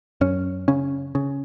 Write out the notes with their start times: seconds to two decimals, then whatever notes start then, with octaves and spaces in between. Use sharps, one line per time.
0.21 F#2 C#4
0.68 C#3 C#4
1.15 C#3